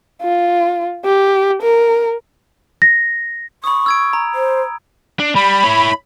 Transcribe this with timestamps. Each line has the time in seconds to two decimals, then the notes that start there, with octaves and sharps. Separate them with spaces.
0.22 F4
1.05 G4
1.62 A#4
2.82 A#6
3.64 B5 C#6 D#6
3.86 E6 G#6 D7
4.13 A#5
4.35 C5
5.20 D4
5.36 G3 B5
5.64 E4 C#5